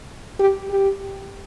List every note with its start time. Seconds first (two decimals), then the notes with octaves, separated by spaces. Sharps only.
0.39 G4
0.70 G4